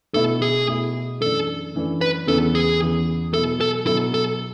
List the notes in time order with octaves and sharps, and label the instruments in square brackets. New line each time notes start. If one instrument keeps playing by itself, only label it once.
[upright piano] B2 A3 E4 [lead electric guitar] A4
[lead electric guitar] G#4
[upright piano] B2 A3 E4
[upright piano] F#2 E3 A3 D4 [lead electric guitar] A4
[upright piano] F#2 E3 A3 D4
[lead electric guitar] B4
[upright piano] E2 C#3 E3 B3 [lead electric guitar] A4
[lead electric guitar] G#4
[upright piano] E2 C#3 E3 B3
[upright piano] B2 F#3 B3 E4 [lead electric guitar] A4
[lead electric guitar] A4
[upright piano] B2 F#3 B3 E4 [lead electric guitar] A4
[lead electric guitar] A4